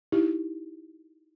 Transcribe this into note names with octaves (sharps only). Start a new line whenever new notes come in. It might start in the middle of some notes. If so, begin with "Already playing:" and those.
D#4 E4 G4